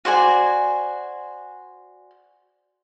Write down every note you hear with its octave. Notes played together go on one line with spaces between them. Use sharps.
F#4 C5 D5 G#5